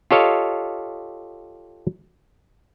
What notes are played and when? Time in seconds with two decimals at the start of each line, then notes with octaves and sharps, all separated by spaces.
0.11 F4 G4 A4 C#5 D#5 F5